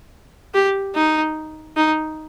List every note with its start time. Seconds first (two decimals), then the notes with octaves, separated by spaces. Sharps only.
0.54 G4
0.95 D#4
1.76 D#4